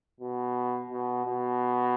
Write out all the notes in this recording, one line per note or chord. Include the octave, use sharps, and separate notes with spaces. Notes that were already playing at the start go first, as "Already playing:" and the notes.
B2
B2
B2